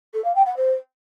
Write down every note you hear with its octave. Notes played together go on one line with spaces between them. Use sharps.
A4
F5
G5
F#5
C5